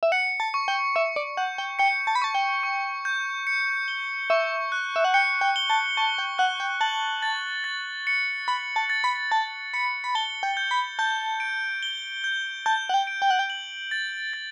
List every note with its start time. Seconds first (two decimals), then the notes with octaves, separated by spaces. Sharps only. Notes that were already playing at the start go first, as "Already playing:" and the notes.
0.03 E5
0.12 F#5 C#7
0.40 A5
0.54 C#6
0.68 G5
0.96 E5 C#6
1.16 D5
1.37 F#5 G6
1.58 G5
1.79 G5 C#7
2.07 A5
2.15 B5
2.22 A5 C#6
2.35 G5
2.63 C#6
3.05 G6
3.47 C#7
3.88 G7
4.30 E5 C#6
4.72 F#6
4.96 E5
5.05 F#5
5.14 G5 C#7
5.41 G5
5.56 G7
5.70 A5
5.97 A5 C#6
6.18 G5
6.39 F#5 F#6
6.60 G5
6.81 A5 F#7
7.22 A6
7.64 A6
8.07 C#7
8.48 B5 F#7
8.76 A5
8.90 A6
9.04 B5
9.31 A5 A6
9.74 B5 C#7
10.04 B5
10.15 A5 G7
10.43 G5
10.57 G6
10.71 B5
10.99 A5 G6
11.40 D7
11.83 G7
12.24 G6
12.66 A5 G6
12.89 F#5
12.94 G5
13.07 D7
13.22 G5
13.30 F#5
13.39 G5
13.50 F#7
13.91 A6
14.33 A6